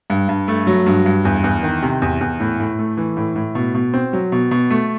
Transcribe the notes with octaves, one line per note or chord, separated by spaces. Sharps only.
G2
G2
A3
F#3
G2
G2
E2
E2
D#3
C3
E2
E2
A2
A2
A3
E3
A2
A2
B2
B2
C4
F#3
B2
B2
A3